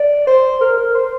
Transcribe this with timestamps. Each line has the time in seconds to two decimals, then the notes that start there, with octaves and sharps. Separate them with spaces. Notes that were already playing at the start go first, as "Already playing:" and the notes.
Already playing: D5
0.27 C5
0.61 A#4
0.77 A#4
0.94 C5